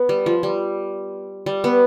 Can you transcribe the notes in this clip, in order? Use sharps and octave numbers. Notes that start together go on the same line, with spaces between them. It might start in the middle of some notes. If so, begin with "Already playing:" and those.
Already playing: B3
G3
F3
G3
G3
B3